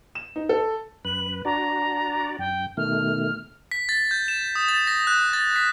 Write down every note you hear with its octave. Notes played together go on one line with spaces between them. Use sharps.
E7
D#4
A4
F#2 B4 F#7
D4 F#4 D5 A#5
F#2 G5
B2 D#3 A3 F6
B6
A6
G6
E7
D#6
A6
A#6
F#6
A6
B6